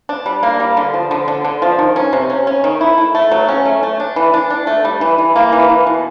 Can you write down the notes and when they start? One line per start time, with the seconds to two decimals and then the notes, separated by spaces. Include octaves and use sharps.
0.09 D4
0.26 G3
0.43 A#3
0.60 G3
0.77 D3
0.94 F3
1.11 D3
1.28 D3
1.45 D3
1.62 F3
1.79 D#3
1.96 C#4
2.13 C3
2.30 C#4
2.47 C#4
2.64 D#3
2.81 E4
2.98 A3
3.15 A3
3.32 F#3
3.49 C#4
3.66 A3
3.83 A3
4.00 D4
4.16 E3
4.34 D4
4.50 D4
4.67 A3
4.85 G3
5.01 E3
5.18 E3
5.36 A#3
5.52 E3
5.69 E3
5.87 B2